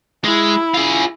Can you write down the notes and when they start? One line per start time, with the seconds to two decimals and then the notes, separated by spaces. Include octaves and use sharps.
0.25 G#3 E4
0.74 F4 G#4